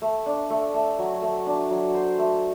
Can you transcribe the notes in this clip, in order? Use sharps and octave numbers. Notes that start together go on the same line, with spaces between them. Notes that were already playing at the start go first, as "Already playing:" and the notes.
A3
D4
A3
A3
F#3
A3
D4
F#3
C5
A3